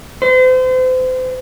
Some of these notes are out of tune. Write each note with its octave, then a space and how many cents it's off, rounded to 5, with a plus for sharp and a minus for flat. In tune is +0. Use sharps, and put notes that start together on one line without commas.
C5 -35